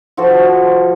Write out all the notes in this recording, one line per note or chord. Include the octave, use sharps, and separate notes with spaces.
F3 F#4 A4 C5